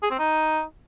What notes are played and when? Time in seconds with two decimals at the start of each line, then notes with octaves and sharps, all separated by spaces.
0.02 G#4
0.11 C4
0.19 D#4